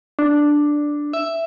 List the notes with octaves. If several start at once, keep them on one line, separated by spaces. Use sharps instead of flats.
D4
E5